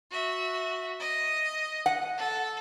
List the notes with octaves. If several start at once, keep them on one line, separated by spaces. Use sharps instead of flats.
F#4 E5
D#5
F#5
A4